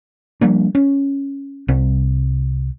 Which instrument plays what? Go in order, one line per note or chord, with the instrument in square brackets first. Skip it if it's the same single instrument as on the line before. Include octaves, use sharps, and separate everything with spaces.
[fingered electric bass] F3 G3 A#3 D4
C#4
C2 C3 C4